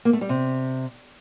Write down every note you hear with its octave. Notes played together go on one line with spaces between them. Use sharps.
A#3
A3
G3
C3